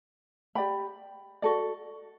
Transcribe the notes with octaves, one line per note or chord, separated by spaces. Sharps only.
G4 D5 G5 B5
F#4 A4 D5